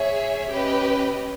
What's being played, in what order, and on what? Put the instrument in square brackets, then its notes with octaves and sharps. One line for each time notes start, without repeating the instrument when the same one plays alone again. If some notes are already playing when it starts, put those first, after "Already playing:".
Already playing: [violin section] G#4 C#5 E5
C#4 G4 B4 D#5